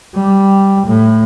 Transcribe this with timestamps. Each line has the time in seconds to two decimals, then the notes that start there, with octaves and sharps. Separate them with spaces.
0.15 G3
0.87 A2